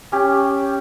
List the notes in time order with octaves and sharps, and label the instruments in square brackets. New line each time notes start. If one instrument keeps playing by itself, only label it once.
[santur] C#4 G4